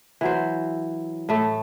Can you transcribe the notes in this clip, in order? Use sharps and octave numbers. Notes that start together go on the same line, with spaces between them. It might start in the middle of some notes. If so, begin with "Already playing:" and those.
E3 F#3 C5
A2 A3